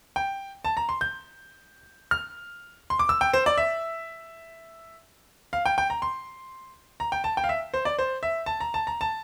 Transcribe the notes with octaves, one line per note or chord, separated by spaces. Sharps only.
G5
A5
A#5
C6
G6
F6
C6
D6
E6
G5
C5
D5
E5
F5
G5
G5
A#5
C6
A#5
G5
A5
G5
F5
E5
C5
D5
C5
E5
A5
A#5
A5
A#5
A5